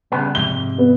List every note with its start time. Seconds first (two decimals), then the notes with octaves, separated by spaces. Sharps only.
0.12 C#3 G3 B3
0.35 F2 G#2 C3 G7
0.78 B3